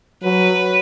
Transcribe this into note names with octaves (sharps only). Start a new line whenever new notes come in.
F#3 B4